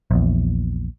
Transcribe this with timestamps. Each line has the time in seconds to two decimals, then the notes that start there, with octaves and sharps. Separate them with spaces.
0.11 A#1 E2